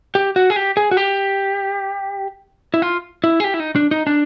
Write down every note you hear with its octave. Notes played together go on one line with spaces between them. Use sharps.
G4
F#4
G#4
G4
G#4
F#4
G4
E4
F4
E4
G#4
G4
E4
D#4
D4
D#4
D4